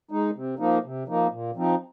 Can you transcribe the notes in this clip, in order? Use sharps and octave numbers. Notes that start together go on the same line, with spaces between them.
G#3 D#4
C3
F3 A#3 D#4
C3
F3 A#3 D#4
A#2
F3 C4 D#4